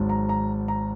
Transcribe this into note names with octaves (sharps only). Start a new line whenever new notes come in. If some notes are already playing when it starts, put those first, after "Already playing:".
Already playing: G#1 G#2 F#3
A#5
A#5
A#5